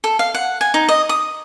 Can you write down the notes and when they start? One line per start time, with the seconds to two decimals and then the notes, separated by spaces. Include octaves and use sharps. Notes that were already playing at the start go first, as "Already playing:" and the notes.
0.04 A4
0.19 F5
0.34 F#5
0.61 G#5
0.74 D#4
0.88 D#5
1.09 D#6